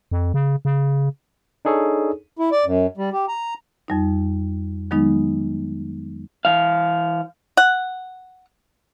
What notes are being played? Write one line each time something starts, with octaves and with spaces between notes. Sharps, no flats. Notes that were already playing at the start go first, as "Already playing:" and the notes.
F2
C#3
C#3
D4 D#4 G#4 A4 C#5
E4
D5
F#2
G3
G4
A#5
F2 G3 D#4
D#3 F#3 G#3 B3 D#4
E3 F5
F#5